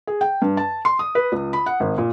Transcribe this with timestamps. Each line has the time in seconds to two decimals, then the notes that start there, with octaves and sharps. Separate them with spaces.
0.07 G#4
0.21 G5
0.42 G2
0.57 A5
0.85 C6
0.99 D#6
1.15 B4
1.32 C#2
1.53 B5
1.66 F#5
1.80 G#1
1.98 A#2